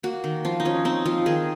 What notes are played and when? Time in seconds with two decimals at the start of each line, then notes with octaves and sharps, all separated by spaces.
0.03 A#3 F#4
0.24 D#3
0.45 F3 F4
0.60 D#4
0.65 F3 C#4
0.85 C4 D#4
1.05 F3 F4
1.26 D#3 G#4